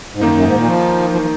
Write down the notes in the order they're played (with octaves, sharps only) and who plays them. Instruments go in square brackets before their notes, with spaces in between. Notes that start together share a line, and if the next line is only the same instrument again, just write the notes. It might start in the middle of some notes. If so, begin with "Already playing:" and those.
[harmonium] G#2
[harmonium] F#2 [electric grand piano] D#3 A#3 D#4
[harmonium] F#2
G#2
A#2
F3
F3
F3